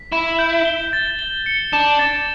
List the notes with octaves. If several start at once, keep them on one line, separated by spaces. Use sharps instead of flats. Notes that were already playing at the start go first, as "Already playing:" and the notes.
Already playing: B6
E4 E7
G6
G7
A6
G7
C#7
D4 E7
A6